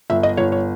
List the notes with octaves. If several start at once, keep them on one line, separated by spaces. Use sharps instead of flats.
G1 E5
D#5
G1 C#5
C#5